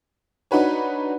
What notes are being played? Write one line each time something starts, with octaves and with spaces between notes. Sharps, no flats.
D4 D#4 F#4 B4 C#5